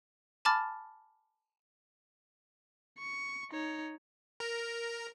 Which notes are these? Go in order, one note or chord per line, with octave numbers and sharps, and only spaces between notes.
G#5 A5 B5 D6 F6 A6
C#6
D#4 C#5
A#4 A#5